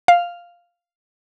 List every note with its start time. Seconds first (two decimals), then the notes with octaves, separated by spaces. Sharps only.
0.08 F5